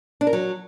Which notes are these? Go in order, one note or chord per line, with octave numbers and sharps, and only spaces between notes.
D4
A#4
F#3